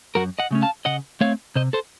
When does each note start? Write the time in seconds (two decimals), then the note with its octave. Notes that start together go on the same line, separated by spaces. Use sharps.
0.15 F#2 F#4 A#4
0.39 D#5 F#5
0.51 C#3 A3 C#4
0.62 F5 A5
0.85 C#3 D#5 F#5
1.21 A3 C4 C#5 F5
1.56 C3 C5 D#5
1.73 A4 C5